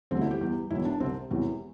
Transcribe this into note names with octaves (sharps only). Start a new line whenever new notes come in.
E1 D2 D3 G3 C4
E4
G4
E2 E3 G3
E1 E2 E3 E4
D4
C2 C3 G3 C4
E1 E2 C3 E3